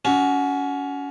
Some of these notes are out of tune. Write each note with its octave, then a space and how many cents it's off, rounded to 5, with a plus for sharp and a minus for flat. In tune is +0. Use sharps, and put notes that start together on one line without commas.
C#4 +25 F#4 +0